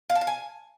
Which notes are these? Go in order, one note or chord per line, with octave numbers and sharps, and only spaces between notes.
F5
A5
F5
G#5